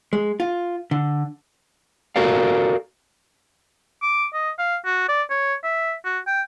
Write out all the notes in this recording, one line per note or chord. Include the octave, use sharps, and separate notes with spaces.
G#3
F4
D3
F#4 A4 A#4 D5 F5
D6
D#5
F5
F#4
D5
C#5
E5
F#4
G5